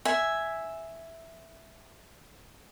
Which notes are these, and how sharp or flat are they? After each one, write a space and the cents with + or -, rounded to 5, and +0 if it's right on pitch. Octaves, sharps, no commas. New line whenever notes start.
E5 +0 G#5 +0